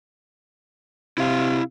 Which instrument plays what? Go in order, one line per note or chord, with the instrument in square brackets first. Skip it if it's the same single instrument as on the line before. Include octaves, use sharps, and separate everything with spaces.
[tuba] C3 [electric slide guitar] E4 F5